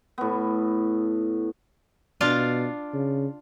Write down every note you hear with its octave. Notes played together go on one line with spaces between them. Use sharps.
A2 B3
B2 D4 F4 F5
C#3